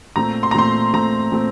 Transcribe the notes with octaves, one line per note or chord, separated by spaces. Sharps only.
A#2 A3 C4 A#5
C6
A#5
A#2 A3 C4 C6
A#2 A3 C4 A#5
A#2 A3 C4